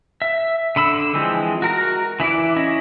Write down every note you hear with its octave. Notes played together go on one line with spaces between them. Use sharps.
E5
D3 B5 E6
E3 F3 G#3 C4
F#4 A#4 A#5
E3 E4 D5 D6
C#4 E4 C#5 D#5